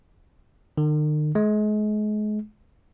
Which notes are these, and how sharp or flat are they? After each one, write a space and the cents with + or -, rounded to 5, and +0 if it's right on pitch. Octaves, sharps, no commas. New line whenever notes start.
D#3 -45
G#3 +35